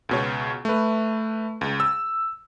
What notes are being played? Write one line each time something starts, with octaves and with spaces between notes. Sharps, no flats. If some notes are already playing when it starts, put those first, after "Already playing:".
C#2 B2 C#5
A3 B4
C#2
E6